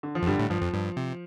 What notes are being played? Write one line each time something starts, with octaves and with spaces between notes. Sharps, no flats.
D3
F3
F2
G2 D3 G3
A2
G2 F3
F2
G2
C3